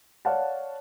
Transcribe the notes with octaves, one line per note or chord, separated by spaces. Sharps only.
C#5 D5 F5 F#5 A5